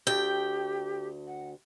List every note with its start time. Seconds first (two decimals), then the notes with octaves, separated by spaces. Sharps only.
0.07 D2 G4 G5
1.27 F#5